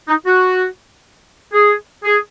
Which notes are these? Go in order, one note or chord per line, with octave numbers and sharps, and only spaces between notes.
D#4
F#4
G#4
G#4